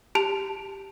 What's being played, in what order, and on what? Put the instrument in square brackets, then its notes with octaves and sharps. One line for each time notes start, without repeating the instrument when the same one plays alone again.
[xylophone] G4 A5 F7